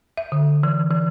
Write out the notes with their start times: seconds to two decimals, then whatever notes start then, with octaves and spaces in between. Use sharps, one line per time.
0.17 E5
0.32 D3
0.63 E3
0.90 E3